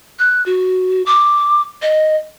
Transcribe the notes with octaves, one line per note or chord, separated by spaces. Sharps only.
F#6
F#4
D6
D#5